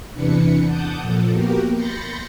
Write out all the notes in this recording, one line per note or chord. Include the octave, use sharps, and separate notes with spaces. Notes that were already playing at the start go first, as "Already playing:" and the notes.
E2 C3 E3 D4 B4 C#7
F#5 A5 D6 D#6 G6
A#2 F3 A4
A#3 B3 F#4 G4 A#4
B5 C6 G6 A6 A#6 C#7